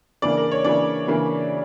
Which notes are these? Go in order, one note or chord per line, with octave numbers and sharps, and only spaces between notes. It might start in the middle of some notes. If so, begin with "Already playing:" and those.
C#3 E3 A#3 D4 D5
A#4
C#5
C#3 E3 A#3 D4 D5
C#3 E3 A#3 D4